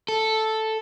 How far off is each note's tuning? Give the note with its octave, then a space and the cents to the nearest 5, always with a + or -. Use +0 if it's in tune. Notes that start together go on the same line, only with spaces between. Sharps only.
A4 +0